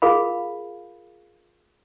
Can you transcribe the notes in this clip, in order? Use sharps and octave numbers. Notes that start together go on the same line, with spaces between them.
F4 G#4 A#4 F5 B5